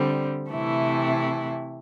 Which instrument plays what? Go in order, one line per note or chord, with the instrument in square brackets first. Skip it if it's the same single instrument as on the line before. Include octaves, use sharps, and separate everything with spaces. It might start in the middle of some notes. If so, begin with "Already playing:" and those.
Already playing: [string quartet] D3 G3 C4
C3 E3 A3 E4